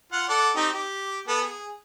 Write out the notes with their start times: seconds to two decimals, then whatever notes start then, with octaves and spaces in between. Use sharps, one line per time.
0.13 F4 F#5
0.29 A4 D5 F#5
0.56 C4 D#4 G4
0.73 G4
1.28 B3 A4
1.41 G#4